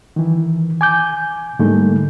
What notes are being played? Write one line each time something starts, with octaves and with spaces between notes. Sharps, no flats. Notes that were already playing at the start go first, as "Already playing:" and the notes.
D#3 E3
G#5 D6 G6
G#2 D3 G3 A3 A#3 D#4